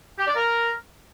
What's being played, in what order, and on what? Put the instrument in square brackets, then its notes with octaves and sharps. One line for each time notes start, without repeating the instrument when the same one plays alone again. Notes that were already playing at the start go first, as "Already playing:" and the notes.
[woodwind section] G4
D5
A#4